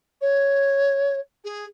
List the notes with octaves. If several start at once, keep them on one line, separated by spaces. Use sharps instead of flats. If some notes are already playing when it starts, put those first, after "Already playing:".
C#5
G#4